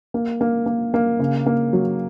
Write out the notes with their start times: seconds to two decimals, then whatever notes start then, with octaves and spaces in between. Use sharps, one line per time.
0.14 A#3
0.41 A#3
0.66 A#3
0.94 A#3
1.20 C#3
1.46 A#3
1.73 F#3